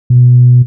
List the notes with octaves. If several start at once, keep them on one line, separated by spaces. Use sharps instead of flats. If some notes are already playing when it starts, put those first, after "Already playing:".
B2